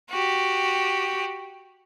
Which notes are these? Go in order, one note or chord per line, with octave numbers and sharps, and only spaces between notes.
F#4 G4